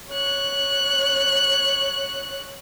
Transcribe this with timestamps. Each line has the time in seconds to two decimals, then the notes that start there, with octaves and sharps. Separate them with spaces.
0.10 C#5 F#6